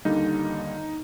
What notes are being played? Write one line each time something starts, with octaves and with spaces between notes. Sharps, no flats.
D#2 D3 G3 A#3 D#4